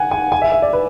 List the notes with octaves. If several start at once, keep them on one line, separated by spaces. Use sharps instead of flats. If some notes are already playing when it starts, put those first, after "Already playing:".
Already playing: F#5 G#5
G#5
G#5
E5
E5
D5
B4